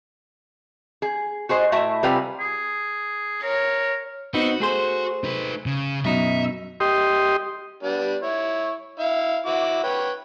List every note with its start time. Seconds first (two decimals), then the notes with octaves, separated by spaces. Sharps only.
1.02 G#4
1.49 F#4 G#4 C5 D#5
1.72 A2 E4 F#4 E5 A5
2.03 C3 G3 F4 B4 G5 G#5
2.40 G#4
3.43 A#4 C#5
4.34 B3 C4 D#4 F#4
4.60 A3 G#4 C5
5.24 D#4 B4
5.66 C#3
6.05 F#2 B2 D#4 E5
6.80 G4 D#5 C6
7.83 G3 B3 D4
8.22 E4 C#5
8.99 E4 F5
9.46 E4 F#4 D6
9.83 B4 C#5 G5